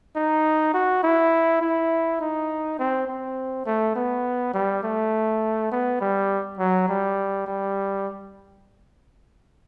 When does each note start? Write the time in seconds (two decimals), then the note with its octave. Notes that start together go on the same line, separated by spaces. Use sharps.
0.16 D#4
0.74 F#4
1.03 E4
1.62 E4
2.21 D#4
2.79 C4
3.08 C4
3.66 A3
3.96 B3
4.54 G3
4.83 A3
5.72 B3
6.01 G3
6.59 F#3
6.89 G3
7.47 G3